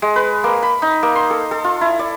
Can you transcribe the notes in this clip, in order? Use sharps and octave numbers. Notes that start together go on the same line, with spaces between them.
G#3
B4
A#3
B5
D#4
A#3
C6
A4
A4
F4
E4
D5